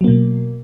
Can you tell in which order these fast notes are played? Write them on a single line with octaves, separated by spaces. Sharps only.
F#3 A#3 B2